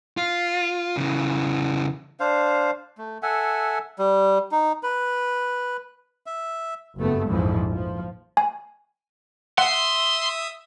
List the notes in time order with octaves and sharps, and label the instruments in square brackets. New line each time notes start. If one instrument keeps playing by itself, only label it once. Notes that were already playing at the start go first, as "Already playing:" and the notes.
[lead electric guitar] F4
C#3 E3
[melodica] D4 C5 F5
A3
A4 E5 F#5 G#5
G3
D#4
B4
E5
[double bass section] F#1 G2 A3 B3
A#1 F2 G#2 E3 F3
F3
[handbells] G#5
[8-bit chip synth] E5 D#6 [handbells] F#5 [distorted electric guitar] C6